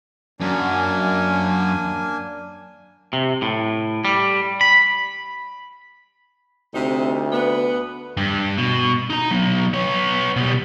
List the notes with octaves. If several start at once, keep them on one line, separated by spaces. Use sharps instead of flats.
F#2 A#3 D4 G#5
C3
A2
G3
B5
D2 C3 D#4
B3
G2
B2
D#4 A#5
F#3 B3
B3 C#5
B2 G3